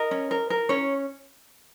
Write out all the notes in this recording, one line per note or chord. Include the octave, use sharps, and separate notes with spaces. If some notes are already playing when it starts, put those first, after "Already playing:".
Already playing: A#4 D#5
C#4
A#4
A#4
C#4 C#5